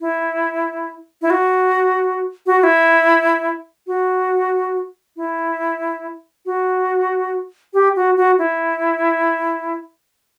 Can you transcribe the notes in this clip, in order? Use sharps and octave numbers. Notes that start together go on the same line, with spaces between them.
E4
E4
F#4
F#4
F#4
E4
F#4
E4
F#4
G4
F#4
F#4
E4